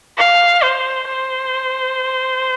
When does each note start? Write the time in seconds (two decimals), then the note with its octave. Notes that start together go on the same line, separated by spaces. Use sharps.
0.18 F5
0.63 C5
1.07 C5